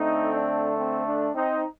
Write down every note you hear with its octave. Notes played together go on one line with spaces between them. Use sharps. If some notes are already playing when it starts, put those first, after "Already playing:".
Already playing: D3 A3 C4 D#4
D4
C4
D4
C4 D#4